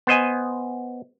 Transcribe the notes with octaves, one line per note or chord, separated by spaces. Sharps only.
B3 C5 D#5 G#5